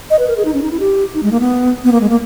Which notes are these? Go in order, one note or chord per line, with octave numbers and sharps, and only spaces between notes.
D#5
B4
A#4
G#4
D#4
C#4
D#4
E4
G4
D#4
G#3
A#3
B3
B3
A#3
G#3
A#3